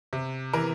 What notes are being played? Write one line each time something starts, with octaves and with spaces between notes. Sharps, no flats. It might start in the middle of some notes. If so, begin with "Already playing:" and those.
C3
E3 A#4